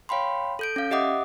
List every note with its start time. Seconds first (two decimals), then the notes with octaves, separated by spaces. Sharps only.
0.09 C#5 F5 G5 B5 C6
0.59 A4 G6 D7
0.76 C#4 F5
0.91 G4 D#5 E5 F#5 D6 D#6